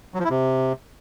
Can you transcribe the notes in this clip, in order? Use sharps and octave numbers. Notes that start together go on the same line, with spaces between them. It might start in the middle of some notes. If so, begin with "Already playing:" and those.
F#3
F3
E4
C3